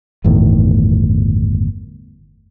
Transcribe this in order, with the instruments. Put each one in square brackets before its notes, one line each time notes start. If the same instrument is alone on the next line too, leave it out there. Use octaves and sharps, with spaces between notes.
[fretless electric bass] G1 E2 A2 D#3